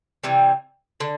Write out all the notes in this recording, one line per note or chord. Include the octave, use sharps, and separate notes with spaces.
C3 E3 G3
D3